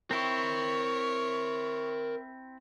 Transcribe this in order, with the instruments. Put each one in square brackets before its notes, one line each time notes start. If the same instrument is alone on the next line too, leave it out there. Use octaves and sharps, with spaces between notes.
[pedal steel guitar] C4 E4 [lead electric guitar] A#4 G5 [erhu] C#5